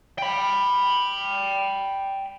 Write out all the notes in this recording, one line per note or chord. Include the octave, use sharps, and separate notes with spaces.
G5 B5